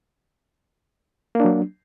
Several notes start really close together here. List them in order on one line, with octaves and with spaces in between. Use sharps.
A#3 D4 F#3